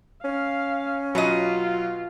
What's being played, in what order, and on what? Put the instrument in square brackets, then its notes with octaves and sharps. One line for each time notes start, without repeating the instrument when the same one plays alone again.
[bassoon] C#4 [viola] F5
[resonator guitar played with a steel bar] B2 D#5 [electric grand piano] F#3 [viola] F4